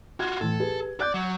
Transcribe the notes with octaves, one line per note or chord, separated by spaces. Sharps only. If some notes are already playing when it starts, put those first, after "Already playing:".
F4 F#4 F#5 C6 G#6
A2 E3 A4
G4 G#4 B4
D5 F#6 G6
F#3